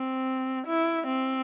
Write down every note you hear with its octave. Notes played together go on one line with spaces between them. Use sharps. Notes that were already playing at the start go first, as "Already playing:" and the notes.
Already playing: C4
E4
C4